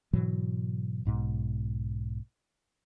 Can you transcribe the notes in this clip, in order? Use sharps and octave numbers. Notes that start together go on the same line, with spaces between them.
G#2 B2 E3 F#3
B1 G#2 B2